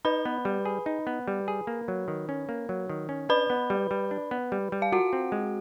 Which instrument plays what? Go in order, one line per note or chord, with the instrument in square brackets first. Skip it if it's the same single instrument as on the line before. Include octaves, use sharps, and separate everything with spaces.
[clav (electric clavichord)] D#4 [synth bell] B4 B5
[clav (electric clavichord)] B3
G3
G#4
D#4
B3
G3
G#4
A#3
F#3
D#3
C#4
A#3
F#3
D#3
C#4
[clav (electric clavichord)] D4 [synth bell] B4 B5
[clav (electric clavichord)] B3
G3
G3
D4
B3
G3
G3
[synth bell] F5
[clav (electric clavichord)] F4 [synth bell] F#4 F#5
[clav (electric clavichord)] C4
G#3